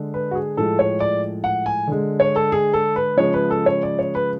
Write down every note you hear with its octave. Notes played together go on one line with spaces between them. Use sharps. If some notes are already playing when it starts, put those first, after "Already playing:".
Already playing: D3 G#3
B4
F#4
G#4
A2 F3 G#3 A4
C#5
D5
F#5
G#5
D3 G#3
C#5
A4
G#4
A4
B4
C#3 F3 G#3 C#5
B4
A4
C#5
D5
C#5
B4